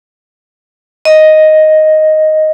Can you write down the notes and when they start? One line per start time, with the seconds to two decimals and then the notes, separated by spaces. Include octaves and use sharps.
1.05 D#5